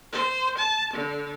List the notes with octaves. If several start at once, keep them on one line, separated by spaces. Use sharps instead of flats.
C5
A5
D3